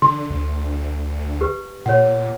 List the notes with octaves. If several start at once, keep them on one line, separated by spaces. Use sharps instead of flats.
D3 C6
D2
G4 B4
A#2 C#5 F#5